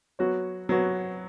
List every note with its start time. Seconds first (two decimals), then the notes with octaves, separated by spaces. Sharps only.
0.19 F#3 B3 F#4 C#5
0.69 F#3 B3 F#4 C#5